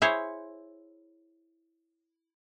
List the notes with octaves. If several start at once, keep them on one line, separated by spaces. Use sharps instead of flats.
E4 G#4 C5 C#5